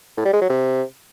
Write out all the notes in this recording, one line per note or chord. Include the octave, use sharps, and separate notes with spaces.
A2
G3
G#3
F#3
C3